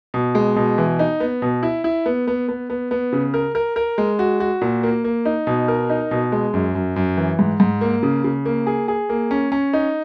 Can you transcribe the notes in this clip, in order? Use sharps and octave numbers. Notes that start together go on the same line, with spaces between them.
B2
G#3
B2
E3
D#4
B3
B2
E4
E4
B3
B3
B3
B3
B3
C#3
A#4
A#4
A#4
G#3
F#4
F#4
A#2
A#3
A#3
D#4
B2
A#4
D#4
B2
G#3
F#2
F#2
F#2
E3
G#2
G#2
A#3
C#3
C#3
A#3
G#4
G#4
A#3
C#4
C#4
D#4